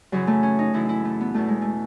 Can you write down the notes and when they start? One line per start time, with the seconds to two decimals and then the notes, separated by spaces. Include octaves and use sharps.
0.12 F#2 C#3 E3 F#3
0.27 A3
0.43 C#4
0.59 D#4
0.73 F#2 C#3 E3 E4
0.89 E4
1.05 A3
1.21 B3
1.34 E2 B2 A3
1.48 G#3
1.62 A3